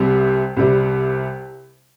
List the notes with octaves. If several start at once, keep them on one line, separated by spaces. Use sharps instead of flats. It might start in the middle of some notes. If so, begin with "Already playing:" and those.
Already playing: C2 C3 G3
C2 C3 G3